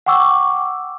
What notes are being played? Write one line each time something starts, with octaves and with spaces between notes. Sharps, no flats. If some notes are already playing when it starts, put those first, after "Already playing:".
F#5 G5 C#6 D6 E6